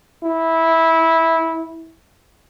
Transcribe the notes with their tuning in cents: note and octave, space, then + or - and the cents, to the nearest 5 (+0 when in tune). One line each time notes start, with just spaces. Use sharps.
E4 -15